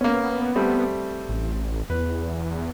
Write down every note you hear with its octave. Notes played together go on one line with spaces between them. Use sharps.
A#3 B3 C#4
G3 A3 C4
A1
E2 B4